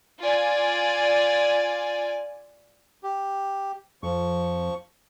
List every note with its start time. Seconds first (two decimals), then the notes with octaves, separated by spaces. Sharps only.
0.20 F4 D5 G#5
3.03 G4
4.03 F2 F3 C#6